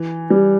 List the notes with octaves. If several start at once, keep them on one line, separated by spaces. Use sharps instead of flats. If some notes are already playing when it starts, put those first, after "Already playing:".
Already playing: E3
G3